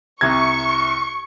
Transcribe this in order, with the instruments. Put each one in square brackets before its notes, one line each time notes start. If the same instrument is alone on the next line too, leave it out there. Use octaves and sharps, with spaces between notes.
[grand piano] C2 C3 G#6 [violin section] C#6